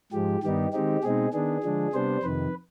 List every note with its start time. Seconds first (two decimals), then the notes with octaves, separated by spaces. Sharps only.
0.12 G#2 F3 G#3 G4
0.43 G2 D#3 G3 B3 D#4 G4
0.73 D#3 G#3 C4 D#4 G4
1.03 B2 G#3 C4 D#4 G#4
1.33 D#3 B3 D4 G#4
1.63 D3 F3 G#3 D4
1.93 C3 G3 B3 D4 C5
2.23 F2 C3 D#3 B4